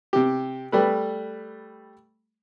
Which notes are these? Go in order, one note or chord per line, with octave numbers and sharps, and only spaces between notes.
C3 G4
G3 A3 B4